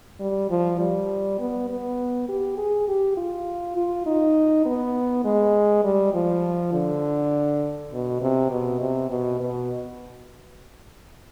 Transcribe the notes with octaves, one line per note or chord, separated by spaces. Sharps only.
G3
F3
G3
B3
B3
G4
G#4
G4
F4
F4
D#4
B3
G#3
G3
F3
D3
B2
C3
B2
C3
B2
B2